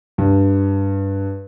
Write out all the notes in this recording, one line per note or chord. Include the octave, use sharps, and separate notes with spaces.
G2